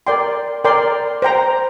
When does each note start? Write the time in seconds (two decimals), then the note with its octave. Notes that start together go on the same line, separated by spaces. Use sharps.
0.07 A#4 D5 G5 C6
0.64 A#4 D5 G5 C6
1.22 C5 G5 A#5